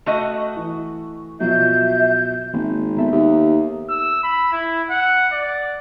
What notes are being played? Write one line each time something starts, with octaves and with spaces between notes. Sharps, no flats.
A3 F#4 D#5
E3
B2 F3 F#3 E5 G6
G#1 A#3 C4
B3 A4 E5 A#5
D#2
E6
B5
E4
F#5
D5